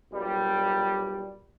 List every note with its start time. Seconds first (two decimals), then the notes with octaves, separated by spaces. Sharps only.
0.12 B1 A#2 G3